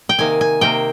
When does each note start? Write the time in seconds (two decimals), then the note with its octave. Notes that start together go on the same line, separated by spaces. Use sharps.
0.09 G5
0.19 C3 D#3 A#3 G#5
0.41 G#5
0.61 C3 D#3 A#3 G5